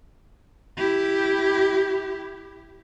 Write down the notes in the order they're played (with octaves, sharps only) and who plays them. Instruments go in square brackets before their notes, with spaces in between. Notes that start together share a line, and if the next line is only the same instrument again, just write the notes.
[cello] E4 G4